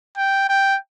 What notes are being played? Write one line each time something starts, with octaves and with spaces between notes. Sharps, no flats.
G5
G5